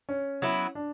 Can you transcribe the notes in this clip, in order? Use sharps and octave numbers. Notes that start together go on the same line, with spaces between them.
C#4
F#3 B3 E4
D4